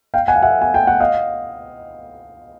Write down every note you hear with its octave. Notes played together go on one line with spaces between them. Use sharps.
F5 G5
F#5 G#5
F5
E5 F#5
G#5
G5
F#5
D#5 F5